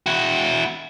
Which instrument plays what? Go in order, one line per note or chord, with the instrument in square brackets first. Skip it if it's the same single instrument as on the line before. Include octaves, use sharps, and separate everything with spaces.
[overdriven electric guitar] E4 F#4